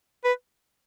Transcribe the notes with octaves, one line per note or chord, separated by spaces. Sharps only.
B4